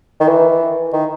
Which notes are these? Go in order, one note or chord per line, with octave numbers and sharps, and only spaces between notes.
D#3
E3
D#3